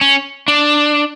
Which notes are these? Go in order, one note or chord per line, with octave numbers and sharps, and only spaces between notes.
C#4
D4